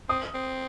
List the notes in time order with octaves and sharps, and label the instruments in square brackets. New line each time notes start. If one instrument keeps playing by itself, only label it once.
[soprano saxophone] C4 [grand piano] D#6
[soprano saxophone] C4